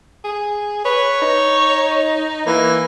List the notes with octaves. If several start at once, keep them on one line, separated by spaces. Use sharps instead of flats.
G#4
B4 C#5
D#4
E3 A#3